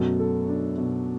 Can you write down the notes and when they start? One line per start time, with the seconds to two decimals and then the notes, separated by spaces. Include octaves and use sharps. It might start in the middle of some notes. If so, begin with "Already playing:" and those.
Already playing: F#2 B2 F#3 A3
0.19 A4
0.48 D4
0.78 B2